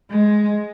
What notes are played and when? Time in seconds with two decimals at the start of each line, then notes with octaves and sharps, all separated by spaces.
0.10 G#3